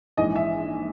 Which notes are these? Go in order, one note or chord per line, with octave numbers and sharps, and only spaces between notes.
A#1 G#2 E3 D#5
E5